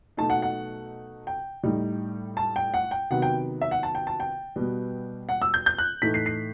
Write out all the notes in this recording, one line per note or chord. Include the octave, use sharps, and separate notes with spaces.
B2 F#3 A3 D#4 A5
F#5
F#5
G5
A2 G3 D#4
A5
G5
F#5
G5
C3 D#3 F#3 B3 F#5
G5
E5
F#5
A5
G5
A5
G5
B2 G3 B3
F#5
E6
G6
G6
F#6
A2 E3 A3 D#4 B6
C7
C7